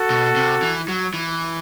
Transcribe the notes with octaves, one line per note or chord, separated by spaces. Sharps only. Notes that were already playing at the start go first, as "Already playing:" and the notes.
Already playing: F#4 A4
B2
C3
E3
F#3
E3